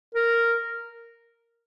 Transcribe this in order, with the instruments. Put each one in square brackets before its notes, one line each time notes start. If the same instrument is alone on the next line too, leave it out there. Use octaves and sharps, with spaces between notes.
[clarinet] A#4